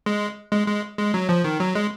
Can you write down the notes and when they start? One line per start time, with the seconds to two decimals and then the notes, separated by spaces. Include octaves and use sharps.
0.06 G#3
0.52 G#3
0.67 G#3
0.98 G#3
1.14 F#3
1.29 F3
1.44 D#3
1.60 F#3
1.75 G#3